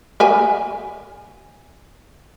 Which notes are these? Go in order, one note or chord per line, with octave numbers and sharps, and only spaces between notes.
A#4 E5 G#5